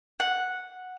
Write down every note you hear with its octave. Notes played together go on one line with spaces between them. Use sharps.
F#5